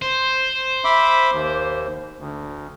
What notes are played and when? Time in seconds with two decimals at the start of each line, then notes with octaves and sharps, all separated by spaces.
0.02 C5
0.84 E5 B5 D6
1.32 D#2
2.19 D2